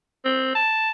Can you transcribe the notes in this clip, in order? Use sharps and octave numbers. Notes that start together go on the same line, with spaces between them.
C4
A5